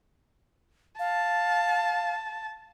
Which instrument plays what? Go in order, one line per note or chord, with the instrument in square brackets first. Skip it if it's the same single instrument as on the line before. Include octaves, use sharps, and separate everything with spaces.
[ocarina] F5 [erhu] A5